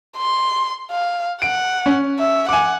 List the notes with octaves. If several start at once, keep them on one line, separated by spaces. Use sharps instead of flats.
C6
F5
F#5 D7
C#4
E5
F#5 G#5 D6